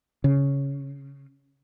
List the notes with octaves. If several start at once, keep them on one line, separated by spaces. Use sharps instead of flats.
C#3